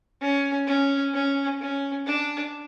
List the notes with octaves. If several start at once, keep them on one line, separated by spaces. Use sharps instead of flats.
C#4
C#4
C#4
C#4
D4